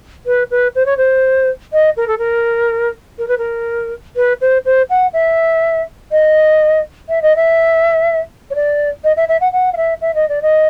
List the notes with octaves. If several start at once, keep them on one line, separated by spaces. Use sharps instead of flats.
B4
B4
C5
C#5
C5
D#5
A#4
A4
A#4
A#4
B4
A#4
B4
C5
C5
F#5
E5
D#5
E5
D#5
E5
C#5
D5
D#5
E5
E5
F#5
F#5
F5
E5
E5
D#5
D5
D#5